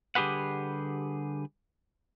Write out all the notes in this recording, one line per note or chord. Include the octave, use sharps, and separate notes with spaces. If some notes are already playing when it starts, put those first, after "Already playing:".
D3 G3 G4 G#4 B4 F#5